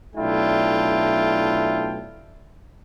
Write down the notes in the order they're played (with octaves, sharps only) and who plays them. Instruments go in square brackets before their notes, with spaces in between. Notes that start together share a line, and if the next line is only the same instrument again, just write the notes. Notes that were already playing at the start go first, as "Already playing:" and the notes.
[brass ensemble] B1 A3 D4 E4 F4 G5